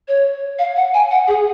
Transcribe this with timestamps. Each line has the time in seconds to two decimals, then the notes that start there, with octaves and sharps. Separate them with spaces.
0.08 C#5
0.59 F5
0.76 F#5
0.94 G#5
1.11 F#5
1.28 G#4